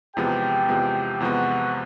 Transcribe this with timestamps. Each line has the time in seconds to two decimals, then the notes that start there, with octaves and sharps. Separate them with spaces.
0.17 E2 C3 F3 G#3 B3 G4 G5
0.68 E2 C3 F3 G#3 B3
1.20 E2 C3 F3 G#3 B3 F#4 F#5